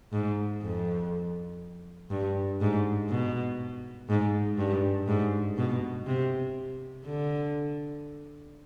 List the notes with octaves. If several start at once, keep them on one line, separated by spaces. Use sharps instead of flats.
G#2
F2
G2
G#2
B2
G#2
G2
G#2
B2
C3
D3